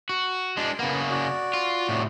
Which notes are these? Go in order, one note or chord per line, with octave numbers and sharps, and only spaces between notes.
F#4
G#3 D4 C6
C#3 A#3 B3
F#4 D5
F4
A2 C3